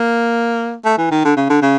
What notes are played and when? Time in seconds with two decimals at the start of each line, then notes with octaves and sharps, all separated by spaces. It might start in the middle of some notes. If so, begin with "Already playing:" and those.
Already playing: A#3
0.85 A3
0.98 E3
1.11 D#3
1.25 D3
1.37 C#3
1.50 D3
1.62 C#3